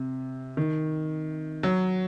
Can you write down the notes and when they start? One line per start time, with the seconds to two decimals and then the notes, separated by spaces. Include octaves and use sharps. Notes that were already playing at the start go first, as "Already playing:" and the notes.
Already playing: C3
0.57 D#3
1.63 F#3